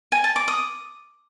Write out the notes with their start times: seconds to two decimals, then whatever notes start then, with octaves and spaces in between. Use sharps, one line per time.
0.12 G#5
0.24 A5
0.36 D6
0.48 D#6